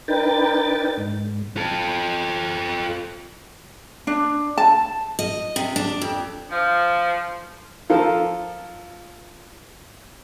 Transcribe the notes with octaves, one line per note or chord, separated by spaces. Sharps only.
D4 D#4 A#4 B4 G5 A6
G#2
F4 A4
D4
A5
D#5
C3
D4
F2
F3
F3 F4 A4 A#4